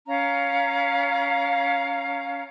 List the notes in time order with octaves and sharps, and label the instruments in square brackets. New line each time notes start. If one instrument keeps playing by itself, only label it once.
[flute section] C#4 F5 A#5